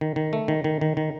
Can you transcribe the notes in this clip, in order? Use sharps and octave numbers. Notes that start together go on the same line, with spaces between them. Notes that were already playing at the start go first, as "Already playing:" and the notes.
D#3
D#3
A3
D#3
D#3
D#3
D#3